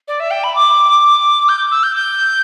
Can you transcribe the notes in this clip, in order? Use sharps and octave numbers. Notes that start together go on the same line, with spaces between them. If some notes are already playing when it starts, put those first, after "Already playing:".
D5
E5
G5
B5
D6
G6
E6
G6
G6